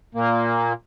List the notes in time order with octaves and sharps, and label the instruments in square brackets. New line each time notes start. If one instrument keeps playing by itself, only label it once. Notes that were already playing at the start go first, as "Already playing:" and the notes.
[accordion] A#2 A#3